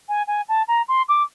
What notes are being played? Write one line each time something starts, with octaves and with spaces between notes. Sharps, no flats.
G#5
G#5
A5
A#5
C6
D6